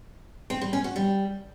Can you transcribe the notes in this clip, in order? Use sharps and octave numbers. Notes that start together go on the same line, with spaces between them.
C4
G3
C#4
F#4
G3